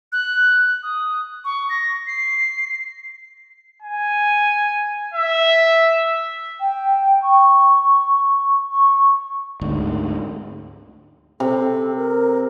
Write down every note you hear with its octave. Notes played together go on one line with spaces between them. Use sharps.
F#6
D#6
C#6
A#6
C7
G#5
E5
G5
C#6
C#6
D2 G#2 D3
C3 A4
A#4